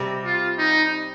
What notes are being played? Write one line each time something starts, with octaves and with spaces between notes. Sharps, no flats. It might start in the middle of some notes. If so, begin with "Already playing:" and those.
Already playing: C3 G3 C4 G4
F4
D#4